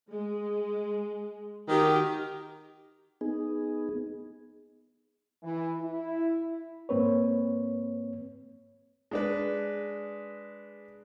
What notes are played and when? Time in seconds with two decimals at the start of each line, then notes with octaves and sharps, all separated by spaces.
0.12 G#3
1.68 D#3 F#4 G4 A#4
3.21 B3 D#4 G#4
5.43 E3
5.80 E4
6.89 G#2 A#3 C4 B4 C#5
9.11 G#3 D4 B4